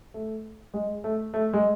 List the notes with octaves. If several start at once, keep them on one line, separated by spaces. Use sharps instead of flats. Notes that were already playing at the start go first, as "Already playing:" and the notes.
A3
G#3
A3
A3
G#3